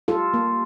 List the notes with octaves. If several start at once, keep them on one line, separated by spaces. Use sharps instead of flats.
G3 F4 A4
A#3